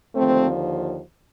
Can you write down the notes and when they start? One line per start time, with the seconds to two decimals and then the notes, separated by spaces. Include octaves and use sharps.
0.15 D#2 D3 F3 A3 C4